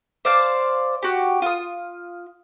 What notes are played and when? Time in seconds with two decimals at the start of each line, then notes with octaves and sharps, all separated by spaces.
0.25 C5 D5 F5 A5
1.02 F#4 G4
1.42 F4 D#6